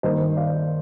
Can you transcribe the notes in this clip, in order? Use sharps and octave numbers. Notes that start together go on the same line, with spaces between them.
G2 D#3 A#3 C5 D#5
D5 F5